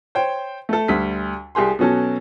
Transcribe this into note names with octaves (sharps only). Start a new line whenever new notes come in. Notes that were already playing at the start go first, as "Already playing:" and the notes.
C5 C#5 G5
A3 A4
D2 G3 B6
C2 G4 G#4 C6
B2 F#3 C#4 A4